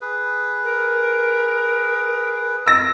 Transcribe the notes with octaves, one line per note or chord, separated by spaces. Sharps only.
G#4 B4
A#4
E6 A#6